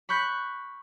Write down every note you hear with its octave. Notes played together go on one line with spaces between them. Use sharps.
B5 C#6 F#6 G6 B6